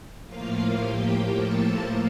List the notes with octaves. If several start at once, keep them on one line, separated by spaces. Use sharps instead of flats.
A2 F3 A#3 F4 F5
G4 G5
A4 A5